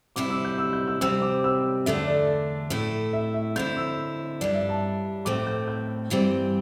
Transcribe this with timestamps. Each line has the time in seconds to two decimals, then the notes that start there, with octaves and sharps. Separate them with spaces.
0.16 D2 C3 G3 E4 D6
0.30 E6
0.45 G6
0.58 E6
0.73 G6
0.88 E6
1.01 C3 G3 C4 E6
1.22 D6
1.44 E6
1.86 E2 D3 A3 D4 E5
2.07 D5
2.70 A2 A3 E4
3.13 E5
3.34 E5
3.56 D3 C4 E4 G6
3.77 E6
4.41 G2 G3 D4 D5
4.54 E5
4.69 A5
5.25 A2 A3 C4 D6
5.47 G6
5.68 G6
6.10 G2 E3 G3 C4